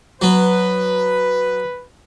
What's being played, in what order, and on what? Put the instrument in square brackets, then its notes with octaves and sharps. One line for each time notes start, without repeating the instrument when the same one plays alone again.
[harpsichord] F#3 B3 [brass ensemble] B4